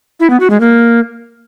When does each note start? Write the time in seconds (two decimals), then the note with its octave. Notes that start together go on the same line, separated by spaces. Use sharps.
0.20 E4
0.30 B3
0.40 F#4
0.50 G#3
0.60 A#3